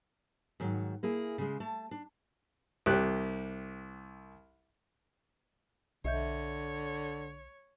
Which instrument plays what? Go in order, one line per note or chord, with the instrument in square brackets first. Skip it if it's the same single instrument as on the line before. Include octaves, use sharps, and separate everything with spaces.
[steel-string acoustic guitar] G#2 D#3 F#3
A#3 E4 G#4
C#3 G#3
A3 A5
D4
[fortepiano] C2 G4 F#6
[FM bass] B1 [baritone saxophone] D3 [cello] C#5 [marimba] D#5 E5 G6